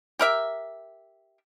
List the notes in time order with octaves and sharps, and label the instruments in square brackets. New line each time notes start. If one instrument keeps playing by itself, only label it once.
[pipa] G4 A#4 E5